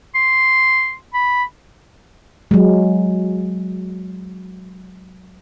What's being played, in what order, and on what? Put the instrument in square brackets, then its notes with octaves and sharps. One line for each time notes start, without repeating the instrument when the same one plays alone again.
[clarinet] C6
B5
[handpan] F#3 G#3